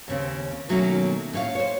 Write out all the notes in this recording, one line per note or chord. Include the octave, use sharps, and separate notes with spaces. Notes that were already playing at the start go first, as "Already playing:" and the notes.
D#2 C#3 C4
B2 D#3 F#3 A3 A#3 C#4
A2 C#5 F5
C5 C#5